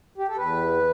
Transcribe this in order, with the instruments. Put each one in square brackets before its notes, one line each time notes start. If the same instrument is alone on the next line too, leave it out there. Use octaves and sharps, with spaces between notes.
[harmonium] G4
A4
E2 B4